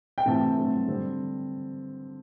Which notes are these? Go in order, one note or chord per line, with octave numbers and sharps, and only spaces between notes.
G5
C3 E3 A3 C4 A5
G2 F#3 A3 C4
D3 G3 C4